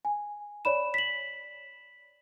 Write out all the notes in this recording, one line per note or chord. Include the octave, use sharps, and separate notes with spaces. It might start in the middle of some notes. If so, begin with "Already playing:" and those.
G#5
C#5 D5 B5 E7
B6 F#7